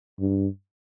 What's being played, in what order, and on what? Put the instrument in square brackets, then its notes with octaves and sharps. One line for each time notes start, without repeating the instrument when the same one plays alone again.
[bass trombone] G2